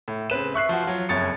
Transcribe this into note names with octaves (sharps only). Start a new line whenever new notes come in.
A2
C#3 C4 B4 E7
E5 C#6 F#6 C7
F3 F#4
F#3 F4
F#1 F2 C#5 A6 C#7